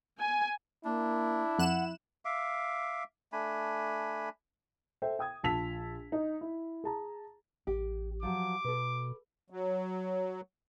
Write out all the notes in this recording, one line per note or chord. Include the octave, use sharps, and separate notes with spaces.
G#5
A#3 D4 E4
F2 F#5 F#6 E7
E5 F5 D6
A3 D4 G#5 B5
A4 C5 E5 G5
G5 D#6 G#6
A#1 F4 A5 E6 B6 F7
D#4
E4
G#4 A5 A#5
A1 G4
F3 F#3 F#4 D6
B2 A4 B4
F#3